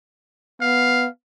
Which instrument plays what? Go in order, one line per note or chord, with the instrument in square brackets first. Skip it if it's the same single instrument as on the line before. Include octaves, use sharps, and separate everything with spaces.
[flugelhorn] B3 [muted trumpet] F5